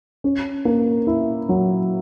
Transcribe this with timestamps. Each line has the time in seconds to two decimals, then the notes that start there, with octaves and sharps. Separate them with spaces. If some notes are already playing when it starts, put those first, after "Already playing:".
0.24 C#4
0.65 A#3
1.07 E4
1.49 F#3